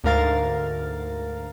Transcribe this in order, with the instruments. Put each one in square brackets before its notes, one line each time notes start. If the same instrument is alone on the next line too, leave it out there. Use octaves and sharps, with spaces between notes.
[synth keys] D2 G#2 A#4 F5 A6